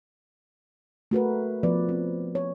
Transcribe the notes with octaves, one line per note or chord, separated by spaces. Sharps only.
A3 F#4 A#4 B4
F3 B3 B4 D5
C4
C#5